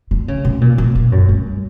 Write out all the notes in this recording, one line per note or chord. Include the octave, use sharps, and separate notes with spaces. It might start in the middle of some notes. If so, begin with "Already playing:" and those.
D3
C#3
B2
A#2
A#2
A#2
F#2
G2